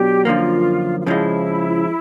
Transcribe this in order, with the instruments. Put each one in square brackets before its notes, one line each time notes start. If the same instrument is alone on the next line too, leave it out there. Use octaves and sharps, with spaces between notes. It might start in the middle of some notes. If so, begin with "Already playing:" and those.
Already playing: [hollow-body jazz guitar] B2 F#3 D4 [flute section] G4
[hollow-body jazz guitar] F#2 D3 F3 A#3 [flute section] F4
[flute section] F4
[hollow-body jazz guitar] F2 C#3 F3 G#3 [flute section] E4